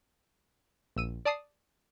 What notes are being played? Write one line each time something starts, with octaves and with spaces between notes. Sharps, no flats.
A#1 E6 D#7
D5 A5 D#6 C7